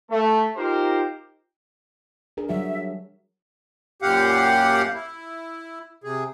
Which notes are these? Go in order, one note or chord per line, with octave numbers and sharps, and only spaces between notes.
A3
D#4 F4 G4 A#4 C5
D4 G#4 A#4
F#3 G3 F#4 E5
F#2 A#2 G4 F5 F#5
E4
C3 G#4